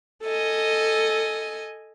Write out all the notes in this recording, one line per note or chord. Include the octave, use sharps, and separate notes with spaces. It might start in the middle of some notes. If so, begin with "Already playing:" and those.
A4 D#5 G#5